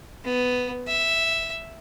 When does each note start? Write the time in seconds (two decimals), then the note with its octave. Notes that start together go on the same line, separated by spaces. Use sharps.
0.24 B3
0.87 E5